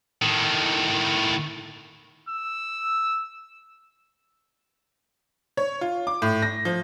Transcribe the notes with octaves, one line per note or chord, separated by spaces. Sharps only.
A2 D#3
E6
C#5
F4
D6
A2
A#6
F3